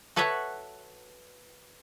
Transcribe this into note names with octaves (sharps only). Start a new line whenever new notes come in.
F#4 A4 B4 C#5 E5 F#5